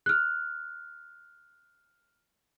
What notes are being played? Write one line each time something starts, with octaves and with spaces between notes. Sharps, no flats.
F6 F#6